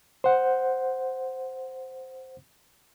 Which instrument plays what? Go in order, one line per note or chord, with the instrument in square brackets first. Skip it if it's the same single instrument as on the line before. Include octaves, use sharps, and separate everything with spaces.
[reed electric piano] C5 F#5